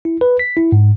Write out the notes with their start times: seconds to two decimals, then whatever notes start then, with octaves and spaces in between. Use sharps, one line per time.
0.05 E4
0.21 B4
0.39 B6
0.57 E4
0.72 G#2